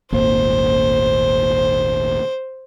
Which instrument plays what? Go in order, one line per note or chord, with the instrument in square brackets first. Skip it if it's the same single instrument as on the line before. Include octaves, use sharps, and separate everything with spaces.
[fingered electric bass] D#1 G#1 A#3 [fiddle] C5